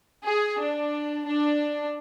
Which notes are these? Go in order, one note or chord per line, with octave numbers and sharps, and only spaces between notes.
G#4
D4
D4